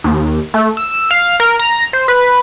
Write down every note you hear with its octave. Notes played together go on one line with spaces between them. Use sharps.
D#2
A3
E6
F5
A#4
A#5
C5
B4